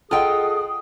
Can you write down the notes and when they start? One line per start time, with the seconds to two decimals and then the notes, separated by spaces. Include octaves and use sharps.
0.11 F4 G#4 A4 D#5 F#5 G5 D#6